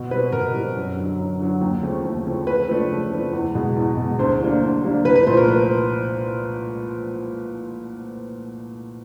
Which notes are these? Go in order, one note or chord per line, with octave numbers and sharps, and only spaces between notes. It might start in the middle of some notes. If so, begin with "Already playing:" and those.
Already playing: B2
G3 C4 B4
B2 A#4
G3 C4
F#2
D3 F#3
F#2
D3 F#3
D#2
C#3 F3 A3 C4
D#2
C#3 F3 A3 C4
C#3 B4
F3 A3 D4
C#3
F3 A3 D4
E2
B2 G#3
E2
B2 G#3
D2 C5
D3 G3 A#3 D4
D2
D3 G3 A#3 D4
C2 B4
B4
A#2 F3 A3 C5
A#4
B4